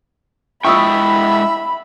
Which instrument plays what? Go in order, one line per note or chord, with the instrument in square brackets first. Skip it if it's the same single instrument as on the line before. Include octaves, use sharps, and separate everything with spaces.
[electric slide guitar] G#3 E4 G5 [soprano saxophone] E5 [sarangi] B5 [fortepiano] C#6 D#6 E6